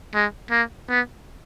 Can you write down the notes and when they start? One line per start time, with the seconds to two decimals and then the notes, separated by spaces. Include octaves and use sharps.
0.14 G#3
0.51 A#3
0.89 B3